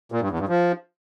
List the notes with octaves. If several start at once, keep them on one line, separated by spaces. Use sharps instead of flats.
A#2
G2
E2
G2
F3